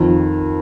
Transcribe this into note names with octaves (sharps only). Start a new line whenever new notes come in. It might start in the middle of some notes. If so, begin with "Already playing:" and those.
Already playing: F2 D#3